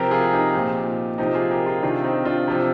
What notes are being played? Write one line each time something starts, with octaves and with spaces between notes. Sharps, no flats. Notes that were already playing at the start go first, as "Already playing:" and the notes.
Already playing: C3 F3 G4 A#4
F4 G#4
D#4 G4
A#2 F3
C3 F3 D#4 G4
F4 G#4
G4 A#4
F4 G#4
C3 D#3 D4 F4
C4 D#4
D4 F4
C3 F3